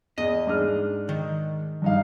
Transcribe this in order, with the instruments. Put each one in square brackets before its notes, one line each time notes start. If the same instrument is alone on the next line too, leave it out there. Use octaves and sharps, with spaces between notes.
[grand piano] E2 [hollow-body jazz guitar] D#5
[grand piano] G#2 D4 F6
[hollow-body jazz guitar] D#3
[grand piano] G2 D#4 F5